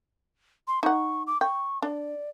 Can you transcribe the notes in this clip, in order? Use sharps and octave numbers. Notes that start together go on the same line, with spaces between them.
C6
D#4 F#5 C#6
D6
G5 C#6
D4 D5